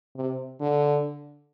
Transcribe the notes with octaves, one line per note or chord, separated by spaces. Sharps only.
C3
D3